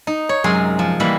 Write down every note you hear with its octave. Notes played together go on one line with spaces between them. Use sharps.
D#4
C#5
F#2 C3 G#3 A#4 G#5 C6
F3
E3 G3 G#3 A#3 B5